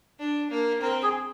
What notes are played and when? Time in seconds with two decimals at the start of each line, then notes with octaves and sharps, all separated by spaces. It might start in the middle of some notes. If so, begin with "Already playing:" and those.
0.19 D4
0.50 A#3
0.81 C4 A#4
1.03 G#4